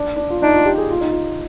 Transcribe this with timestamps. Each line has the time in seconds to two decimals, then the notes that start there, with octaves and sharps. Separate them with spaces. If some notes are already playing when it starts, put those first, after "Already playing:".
Already playing: D4
0.16 D4
0.30 F4
0.42 D4 D#4
0.54 F4
0.66 G4
0.78 G#4
0.90 F4
1.01 D#4
1.11 F4